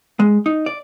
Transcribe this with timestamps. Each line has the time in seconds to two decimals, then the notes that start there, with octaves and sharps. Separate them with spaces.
0.20 G#3
0.46 D#4
0.66 D5